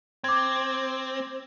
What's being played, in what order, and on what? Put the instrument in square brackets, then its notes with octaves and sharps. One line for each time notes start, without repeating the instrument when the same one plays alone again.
[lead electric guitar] C4 [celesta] D6 G#6